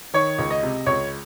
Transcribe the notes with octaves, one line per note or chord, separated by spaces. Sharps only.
D#3 C#5
C#2
D#5
C3
C#2 C#5